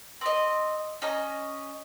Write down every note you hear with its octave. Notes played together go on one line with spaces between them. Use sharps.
C4 D#5
C#4 D#5 A#5